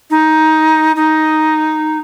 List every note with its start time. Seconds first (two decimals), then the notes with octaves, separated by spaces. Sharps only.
0.10 D#4
0.96 D#4